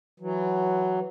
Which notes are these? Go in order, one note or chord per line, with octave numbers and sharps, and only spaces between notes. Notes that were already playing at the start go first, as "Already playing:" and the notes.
E3 F#3